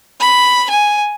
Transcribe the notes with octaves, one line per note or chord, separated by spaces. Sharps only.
B5
G#5